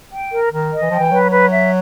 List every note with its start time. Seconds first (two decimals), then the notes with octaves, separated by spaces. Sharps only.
0.12 G5
0.33 A#4
0.52 D#3 A#4
0.72 D#5
0.82 E3
0.91 F3 G5
1.00 E3
1.12 F#3 B4
1.31 B4
1.51 E5